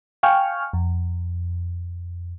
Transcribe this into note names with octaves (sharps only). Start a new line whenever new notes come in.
F5 G5 G#5 C#6 F6
F2